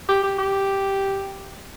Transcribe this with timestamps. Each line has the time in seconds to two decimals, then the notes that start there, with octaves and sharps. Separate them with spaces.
0.09 G4
0.23 G4
0.38 G4